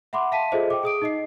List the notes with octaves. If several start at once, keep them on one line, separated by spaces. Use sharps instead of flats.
E5 F#5 B5 C6 D6
E5 F5 A5 B6 D#7
F4 G#4 A4 C5 D#5 E5
G5 D6
G#4 D#6 D7
D#4 D#5 C7